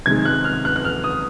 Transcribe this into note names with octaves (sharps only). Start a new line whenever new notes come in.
C3 D#3 G#3 G#6
F#6
F6
F#6
F#6
F6
D#6